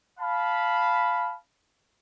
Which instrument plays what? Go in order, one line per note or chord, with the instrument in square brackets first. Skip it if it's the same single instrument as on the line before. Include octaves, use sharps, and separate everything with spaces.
[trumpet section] F5 A5 B5